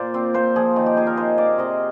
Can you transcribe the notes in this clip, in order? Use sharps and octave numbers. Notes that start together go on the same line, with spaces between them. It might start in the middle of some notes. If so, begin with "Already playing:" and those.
Already playing: A#2 C5 D5
C4
A#2 C5
F3 G#4
D#3
G4
D#4 G#4
A#4
D#3 C5
A#3 D5
C3 D#5